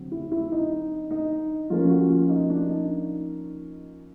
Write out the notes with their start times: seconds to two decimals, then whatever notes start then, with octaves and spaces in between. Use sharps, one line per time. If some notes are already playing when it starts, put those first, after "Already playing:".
Already playing: D3 F#3 C4
0.12 E4
0.32 E4
0.52 D#4
1.11 D#4
1.70 F3 A#3 C#4 F4
1.90 F#4
2.10 F4
2.29 D#4
2.50 D4
2.70 D#4